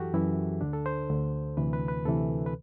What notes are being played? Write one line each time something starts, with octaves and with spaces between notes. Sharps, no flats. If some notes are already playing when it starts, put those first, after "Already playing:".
Already playing: F#2 E3 F#4 G4 A4
F#2 E3 E4
D2 D3 D4
A4
C5
D2 D3
D2 C3 E3 B4
B4
B4
D2 C3 E3 A4
B4